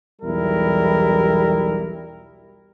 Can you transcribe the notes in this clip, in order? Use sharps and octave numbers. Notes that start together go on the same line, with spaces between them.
B1 E2 G3 E4 A#4